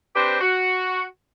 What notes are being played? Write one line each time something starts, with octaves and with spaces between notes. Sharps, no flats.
C4 D4 G4 B4 C5
F#4